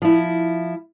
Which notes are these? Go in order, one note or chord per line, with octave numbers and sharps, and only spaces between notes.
F3 E4